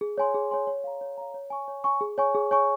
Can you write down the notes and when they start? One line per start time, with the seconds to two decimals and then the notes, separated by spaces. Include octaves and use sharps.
0.01 G#4
0.18 C#5 G#5 C6
0.34 G#4
0.51 C#5 G#5 C6
0.67 C#5
0.84 F5 A#5
1.01 C#5
1.18 F5 A#5
1.34 C#5
1.50 G#5 C#6
1.68 C#5
1.84 G#5 C#6
2.01 G#4
2.18 C#5 G#5 C#6
2.35 G#4
2.51 C#5 G#5 C#6